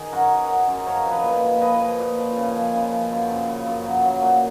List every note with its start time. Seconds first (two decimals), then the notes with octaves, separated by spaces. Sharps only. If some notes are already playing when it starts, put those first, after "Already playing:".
Already playing: D#3 G#4
0.12 F#2 F#4 A#4
0.31 F#2
0.50 F#3
0.68 F#2
0.78 D#5
0.86 F3 A#4 C#5
1.05 F3
1.11 B4 D#5
1.24 A#2
1.43 A#2
1.61 F3 B4 D#5
1.80 F3
1.99 A#2
2.18 F3
2.36 C#3
2.55 F3
2.73 C#3
2.92 F3
3.11 F#2
3.30 C#3
3.48 C#3
3.67 F#2
3.86 F#3
4.05 F#3
4.23 A#2